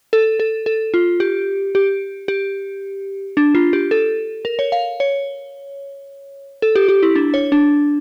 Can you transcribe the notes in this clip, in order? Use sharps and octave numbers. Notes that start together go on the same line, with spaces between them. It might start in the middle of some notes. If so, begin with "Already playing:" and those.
A4
A4
A4
F4
G4
G4
G4
D4
F4
G4
A4
A#4
C#5
F5
C#5
A4
G4
G4
E4
D4
C#5
D4